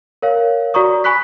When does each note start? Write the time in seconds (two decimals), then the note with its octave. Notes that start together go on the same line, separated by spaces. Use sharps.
0.22 A#4 C#5 F5
0.74 F#4 D5 A#5 C#6 D#6
1.04 G#5 B5 C#6 F#6 B6